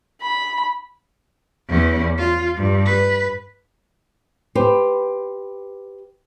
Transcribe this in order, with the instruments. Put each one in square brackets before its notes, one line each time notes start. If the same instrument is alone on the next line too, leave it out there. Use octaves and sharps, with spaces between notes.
[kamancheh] B5
[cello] E2 C#4
F4
G2
B4
[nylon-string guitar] G4 B4 C5